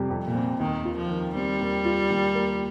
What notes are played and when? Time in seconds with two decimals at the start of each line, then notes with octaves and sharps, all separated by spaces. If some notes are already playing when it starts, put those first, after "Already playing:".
Already playing: F2 C3 G3 C4
0.10 F2
0.23 A#2
0.35 C4
0.60 D#2 D#3
0.85 F4
0.98 F3
1.10 D#3
1.35 G3 C4
1.61 D#2
1.85 F4
2.10 D#2
2.35 A#3